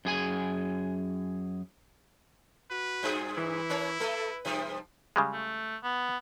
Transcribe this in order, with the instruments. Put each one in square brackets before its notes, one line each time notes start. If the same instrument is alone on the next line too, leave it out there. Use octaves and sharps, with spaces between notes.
[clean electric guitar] F#2 G#4 G#5
[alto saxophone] F#4 [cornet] B4
[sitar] G2 A#2 G#4
[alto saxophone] E3 [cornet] E4
[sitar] C#4 A#4 C#5
[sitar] A3 A4 [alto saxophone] B4
[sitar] G2 C3 F3
[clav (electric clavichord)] C#3 G3 G#3
[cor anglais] A3
B3